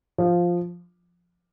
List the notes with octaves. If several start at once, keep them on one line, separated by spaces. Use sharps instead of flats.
F3